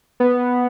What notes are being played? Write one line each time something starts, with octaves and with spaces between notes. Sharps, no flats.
B3